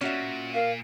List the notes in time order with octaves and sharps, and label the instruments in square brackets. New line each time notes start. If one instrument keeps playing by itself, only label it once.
[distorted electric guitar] A#2 [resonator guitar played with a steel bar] C#4 F#4 E5
[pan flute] A#4 [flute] F5